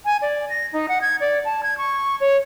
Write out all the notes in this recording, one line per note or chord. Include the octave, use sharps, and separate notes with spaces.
G#5
D5
A#6
D#4
F#5
G#6
D5
A5
G#6
C#6
C#5